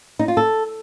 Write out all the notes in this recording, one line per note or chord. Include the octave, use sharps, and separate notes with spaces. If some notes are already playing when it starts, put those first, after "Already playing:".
D#4
F4
A4